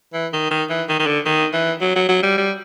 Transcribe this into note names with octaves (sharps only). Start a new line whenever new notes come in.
E3
D#3
D#3
E3
D#3
D#3
D3
D#3
E3
F#3
F#3
F#3
G3
G3